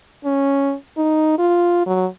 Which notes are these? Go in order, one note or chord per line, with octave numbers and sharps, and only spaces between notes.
C#4
D#4
F4
F#3